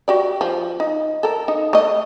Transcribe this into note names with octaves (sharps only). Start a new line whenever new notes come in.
F#4 G4 D5
F3
D#4
A4 A#4
D#4
A3 D#5